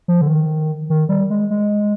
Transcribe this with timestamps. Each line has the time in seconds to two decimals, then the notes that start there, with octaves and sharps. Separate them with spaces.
0.08 F3
0.21 D3
0.28 D#3
0.90 D#3
1.09 G3
1.30 G#3
1.51 G#3